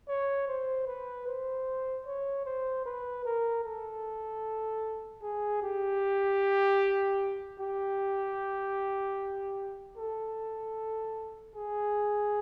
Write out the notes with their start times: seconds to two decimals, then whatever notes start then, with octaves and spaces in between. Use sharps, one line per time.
0.08 C#5
0.48 C5
0.87 B4
1.27 C5
2.06 C#5
2.46 C5
2.86 B4
3.25 A#4
3.64 A4
5.22 G#4
5.62 G4
7.60 G4
9.98 A4
11.55 G#4